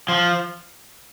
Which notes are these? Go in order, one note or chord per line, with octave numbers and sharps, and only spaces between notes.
F3